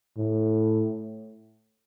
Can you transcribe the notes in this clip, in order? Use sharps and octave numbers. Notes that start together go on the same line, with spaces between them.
A2